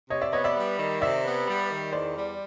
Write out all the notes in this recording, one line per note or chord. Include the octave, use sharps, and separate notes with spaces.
C3 C#5 D#5
D5 E5
B3 C#5 D#5
D5 E5
G3
D#3
C3 D5 E5
B3
G3
D#3
E2 C5 D5
G3